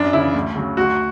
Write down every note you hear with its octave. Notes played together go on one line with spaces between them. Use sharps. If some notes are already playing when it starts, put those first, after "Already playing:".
Already playing: F#2 D4
C#3 E3 E4
D2
C#3 F#3
D2 F#4